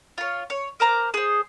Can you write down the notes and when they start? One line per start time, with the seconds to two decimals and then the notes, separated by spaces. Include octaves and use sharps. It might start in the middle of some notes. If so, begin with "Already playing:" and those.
0.18 F4 C#5
0.50 C#5
0.80 A#4 C5 A#5 D6
1.14 G#4 C5